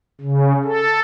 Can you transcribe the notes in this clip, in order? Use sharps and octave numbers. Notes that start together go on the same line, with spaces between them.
C#3
A4